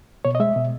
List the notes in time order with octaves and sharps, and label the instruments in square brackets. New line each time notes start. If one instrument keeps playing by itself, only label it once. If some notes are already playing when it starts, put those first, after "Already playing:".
[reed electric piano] B2 C#5
D#5
G#3 E5
B2